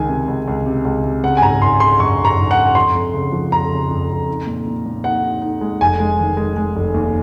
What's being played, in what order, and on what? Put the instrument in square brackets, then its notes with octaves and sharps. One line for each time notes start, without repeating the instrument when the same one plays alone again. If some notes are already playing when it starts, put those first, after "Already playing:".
Already playing: [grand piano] C#2 D#3 [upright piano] G#5
[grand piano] C3
C#2
C#2
C3
C#2
C3
[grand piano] C#3 [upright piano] F#5
[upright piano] G#5
[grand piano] G#1 [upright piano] A#5
[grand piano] G#1 [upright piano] C6
[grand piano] C#3 [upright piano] C6
[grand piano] F#2 [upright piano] C#6
[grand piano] G#1
[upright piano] A#5
[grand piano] G#1
[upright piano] F#5
[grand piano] F#2
[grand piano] F2 [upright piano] C6
[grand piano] F2
C#3
F3
[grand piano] F2 [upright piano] A#5
[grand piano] C#3
F2
F2
D#4
A#2
A#2
A#2
[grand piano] D#4 [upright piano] F#5
[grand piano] D#4
D#4
G#3
[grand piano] F1 [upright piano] G#5
[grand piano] G#3
D#3
G#3
G#3
F1
D#2